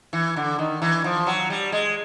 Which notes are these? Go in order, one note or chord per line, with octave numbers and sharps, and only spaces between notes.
E3
D3
D#3
E3
F3
F#3
G3
G#3